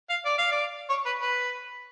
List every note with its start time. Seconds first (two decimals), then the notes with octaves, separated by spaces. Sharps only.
0.10 F5
0.25 D5
0.38 F5
0.52 D5
0.89 C#5
1.06 B4
1.22 B4